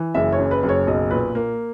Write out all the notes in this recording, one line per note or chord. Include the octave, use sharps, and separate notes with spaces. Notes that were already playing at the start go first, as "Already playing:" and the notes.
Already playing: E3
F#1 E5
C#5
F#2
B4
F#1
C#5
B1 D#5
A#2 B4
A#3